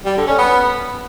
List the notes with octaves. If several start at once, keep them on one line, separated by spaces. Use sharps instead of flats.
G3
D3
C#4
B3